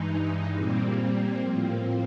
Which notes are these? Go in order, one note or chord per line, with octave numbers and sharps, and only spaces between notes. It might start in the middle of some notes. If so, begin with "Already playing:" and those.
Already playing: G2 E3 G#3 D#4
A#2 G3 A#3 C4
A2 F3 A#3 C4